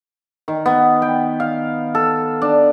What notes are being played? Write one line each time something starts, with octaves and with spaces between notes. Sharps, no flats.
D#3
B3
G5
F5
A4
D4